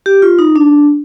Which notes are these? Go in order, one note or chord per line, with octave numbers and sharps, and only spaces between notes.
G4
F4
D#4
D4